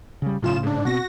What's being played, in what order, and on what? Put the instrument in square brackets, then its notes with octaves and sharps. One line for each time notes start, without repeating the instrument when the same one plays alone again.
[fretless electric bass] C#3 G3
[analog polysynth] B1 F4 E7 [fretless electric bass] A2 C#3
[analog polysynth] G#2 D4
[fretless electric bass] B2 B3 C4 [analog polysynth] F#4 A#6